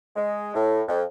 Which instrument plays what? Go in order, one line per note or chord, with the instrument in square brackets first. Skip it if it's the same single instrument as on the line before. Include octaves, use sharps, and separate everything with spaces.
[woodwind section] G#3
A2
F2